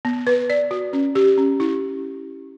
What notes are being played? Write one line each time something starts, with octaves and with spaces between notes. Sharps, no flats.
B3
B4
D5
F#4
C#4
G4
C#4
E4